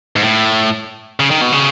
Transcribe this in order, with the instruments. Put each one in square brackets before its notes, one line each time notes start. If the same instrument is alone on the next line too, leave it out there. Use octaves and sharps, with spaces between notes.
[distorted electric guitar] G#2
A2
C#3
D#3
B2
C#3